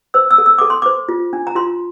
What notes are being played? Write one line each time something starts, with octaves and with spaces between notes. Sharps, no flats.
C5 E6
E6
A4
E6
A4 D6
C6
C5 D6
F4
D4
A#5
F4 C6